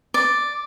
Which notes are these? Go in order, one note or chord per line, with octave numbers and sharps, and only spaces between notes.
D5